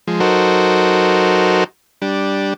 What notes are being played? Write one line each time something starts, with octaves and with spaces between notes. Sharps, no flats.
F3 G#3
F#3 D#4 F#4 A4 A#4 C5
G3 D4